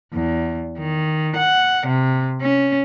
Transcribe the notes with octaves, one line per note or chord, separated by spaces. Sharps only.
E2
D#3
F#5
C3
C#4